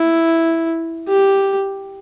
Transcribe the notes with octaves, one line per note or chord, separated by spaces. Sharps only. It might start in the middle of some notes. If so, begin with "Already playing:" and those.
Already playing: E4
G4